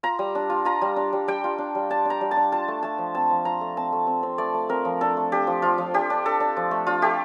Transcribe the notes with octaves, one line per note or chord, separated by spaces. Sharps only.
F4 A#5
G3
D4
F4
F4 A#5
G3
D4
G3
G3 G5
F4
D4
G3
D4 A5
D4 A#5
G3
A5
D4
F4 A5
A3
A3 A5
F3
C4 A5
F3
F4 A#5
A3
C4 A5
A3
C4
C4
A3 D5
A3
C4 A#4
F3
D4 A4
A3
D4 G4
F3
F3 F4
F3
D4 G4
D4
D4 A4
D4
F3
A3
D4 F4
A3 G4